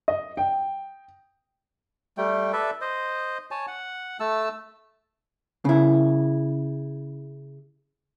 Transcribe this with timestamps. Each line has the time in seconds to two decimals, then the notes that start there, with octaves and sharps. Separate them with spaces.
0.08 D#5
0.37 G5
2.18 G3 A3 G5
2.53 A4 B4 D5 E5
2.81 C5 D#5
3.51 C#5 G#5 A5
3.67 F#5
4.20 A3 A5 E6
5.65 C#3 E4